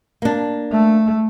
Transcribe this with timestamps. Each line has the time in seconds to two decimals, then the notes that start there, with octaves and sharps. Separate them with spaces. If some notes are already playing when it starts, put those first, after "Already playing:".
0.22 A#3 D4
0.72 A3